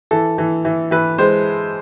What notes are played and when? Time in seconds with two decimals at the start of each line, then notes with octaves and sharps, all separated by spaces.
0.11 E3 A4
0.38 E3
0.65 E3
0.91 E3 B4
1.18 G#3 C5